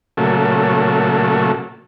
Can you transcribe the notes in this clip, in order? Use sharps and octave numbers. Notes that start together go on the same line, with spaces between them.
A#2 C#3 F#3 A3